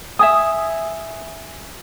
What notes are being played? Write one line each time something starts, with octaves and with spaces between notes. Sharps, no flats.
E5 G#5 D#6